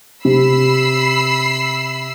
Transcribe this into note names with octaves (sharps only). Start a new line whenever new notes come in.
C3 B5 E6 C7